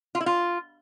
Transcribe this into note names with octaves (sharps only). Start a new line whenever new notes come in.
F4
E4
F4